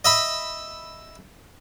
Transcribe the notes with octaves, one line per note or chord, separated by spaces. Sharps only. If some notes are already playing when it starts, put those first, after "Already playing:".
D#5 E5 B5